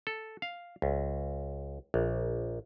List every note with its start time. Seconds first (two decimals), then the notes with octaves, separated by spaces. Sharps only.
0.07 A4
0.42 F5
0.82 C#2
1.94 A#1